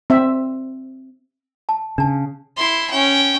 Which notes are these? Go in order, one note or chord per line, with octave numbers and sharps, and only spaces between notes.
C4 E5
A5
C#3 D4 A5
E4 C6
C#4 G5